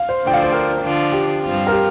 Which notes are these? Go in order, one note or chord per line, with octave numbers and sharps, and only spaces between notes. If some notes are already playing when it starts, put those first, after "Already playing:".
Already playing: F5
C5
D2 D3 F3 D4 G5
F5
C5
A#4
D3 F3 D4 F4
G4
G2 F3 C4 F4
A#4
G4